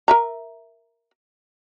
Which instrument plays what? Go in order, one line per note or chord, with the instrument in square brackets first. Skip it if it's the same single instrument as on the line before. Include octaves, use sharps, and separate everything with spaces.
[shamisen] A#4 E5 A#5